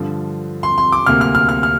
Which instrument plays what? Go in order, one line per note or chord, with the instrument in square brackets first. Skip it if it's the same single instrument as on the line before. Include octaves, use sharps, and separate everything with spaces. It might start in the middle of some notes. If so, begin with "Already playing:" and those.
Already playing: [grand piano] G2 D3 F3
C6
C6
D6
D2 C3 A#3 F6
F6
F6
F6
F6